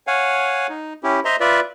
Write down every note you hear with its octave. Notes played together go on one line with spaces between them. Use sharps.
C#5 F5 F#5 G#5
D#4
C#4 E4 G4
C5 D#5 E5 A#5 C6
F4 B4 D5 E5